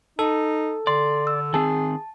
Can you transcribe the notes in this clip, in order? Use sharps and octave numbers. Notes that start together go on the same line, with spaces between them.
D#4 A4
D3 D5 C6
E6
D#3 C4 G#4 A5